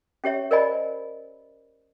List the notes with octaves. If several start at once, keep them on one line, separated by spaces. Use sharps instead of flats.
C#4 G4 C#5 E5
A#4 C5 D5 D#5 G#5 B5